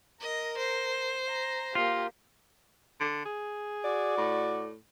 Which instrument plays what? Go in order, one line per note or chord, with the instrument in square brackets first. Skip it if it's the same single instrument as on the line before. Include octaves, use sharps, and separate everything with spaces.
[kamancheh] A#4 [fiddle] D#5
[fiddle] C5
[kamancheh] A#5
[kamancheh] A#3 G4 [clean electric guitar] F4
[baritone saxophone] D3
G#4
[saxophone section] F#4 D5
[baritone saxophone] A2